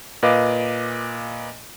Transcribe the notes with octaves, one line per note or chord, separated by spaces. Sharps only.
A#2 B4 D#5 F5 D6